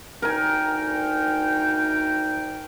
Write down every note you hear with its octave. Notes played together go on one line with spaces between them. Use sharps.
D2 D#4 A#4 G5 G#5